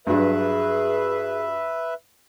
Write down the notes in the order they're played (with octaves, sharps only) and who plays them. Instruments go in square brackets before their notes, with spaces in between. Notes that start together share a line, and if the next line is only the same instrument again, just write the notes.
[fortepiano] G2 F#3 D4 [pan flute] G#4 [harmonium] B4 E5